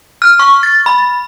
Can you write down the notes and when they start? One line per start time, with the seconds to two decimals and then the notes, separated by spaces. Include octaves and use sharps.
0.22 F6
0.39 C#6
0.63 A6
0.86 B5